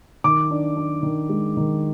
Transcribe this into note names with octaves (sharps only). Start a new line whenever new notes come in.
D#3 D6
D4
D4
D#3
G#3
D#3